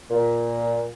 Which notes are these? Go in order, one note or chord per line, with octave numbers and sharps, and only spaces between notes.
A#2